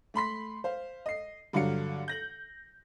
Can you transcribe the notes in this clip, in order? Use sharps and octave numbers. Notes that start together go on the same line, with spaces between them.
A3 B5 C6 B6
C5 F5
D#5 C7
G2 D3 F#3 F5 C#7
G6 A#6 F#7